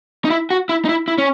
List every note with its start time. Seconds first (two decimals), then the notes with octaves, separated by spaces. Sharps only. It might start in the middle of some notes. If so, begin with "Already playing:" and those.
0.25 D#4
0.30 E4
0.50 F#4
0.69 E4
0.85 D#4
0.89 E4
1.08 E4
1.18 C#4